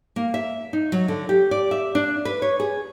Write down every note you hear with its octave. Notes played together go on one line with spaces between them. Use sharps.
A#3
E5
D#4
F#3
D3
G4
D5
E5
D4
B4
C#5
G#4